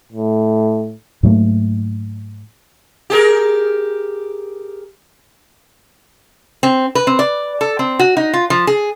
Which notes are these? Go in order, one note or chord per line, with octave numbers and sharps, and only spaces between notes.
A2
G#2 F#3 A3 A#3
G4 G#4 A#4
C4
B4
C4
D5
A4
C4
F#4
D#4
F4
F3
G#4